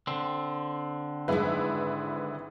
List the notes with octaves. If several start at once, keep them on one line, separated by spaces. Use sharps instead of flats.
D3 C4
G#1 G#3 E4 G#4 B4